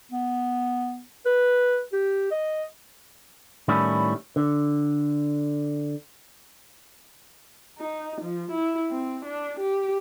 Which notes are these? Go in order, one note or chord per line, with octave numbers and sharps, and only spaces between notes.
B3
B4
G4
D#5
A2 D#3 G3 C#4 E4
D3
D#4
F3
E4
C4
D4
G4